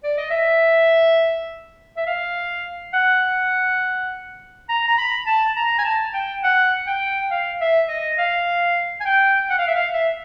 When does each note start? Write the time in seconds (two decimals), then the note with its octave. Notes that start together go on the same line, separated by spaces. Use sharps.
0.04 D5
0.18 D#5
0.31 E5
1.97 E5
2.06 F5
2.93 F#5
4.69 A#5
4.88 A#5
4.98 B5
5.26 A5
5.56 A#5
5.78 G#5
5.85 A5
6.14 G5
6.43 F#5
6.87 G5
7.31 F5
7.61 E5
7.89 D#5
8.18 F5
9.00 G#5
9.05 G5
9.50 F#5
9.58 F5
9.67 E5
9.75 F5
9.93 E5